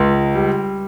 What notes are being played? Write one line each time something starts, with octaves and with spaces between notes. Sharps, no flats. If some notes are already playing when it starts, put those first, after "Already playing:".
Already playing: C#2
G3